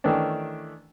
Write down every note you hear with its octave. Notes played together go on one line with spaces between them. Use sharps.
D#3 E3 A3 C#4 D4